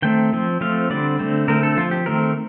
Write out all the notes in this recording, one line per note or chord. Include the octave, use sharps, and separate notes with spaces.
D#3 A3 C4 G5
F3 C4
F3 A3 C4 F5
D3 G3 C4 D5
D3 A3 C4
D3 A3 C4 A#4
A4
F3 C4 F4
G4
D#3 A3 C4 A#4